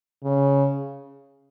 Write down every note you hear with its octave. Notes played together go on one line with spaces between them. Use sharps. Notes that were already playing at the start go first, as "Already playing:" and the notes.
C#3